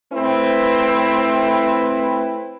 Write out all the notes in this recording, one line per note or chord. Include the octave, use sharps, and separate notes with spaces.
A3 C4 E4 B4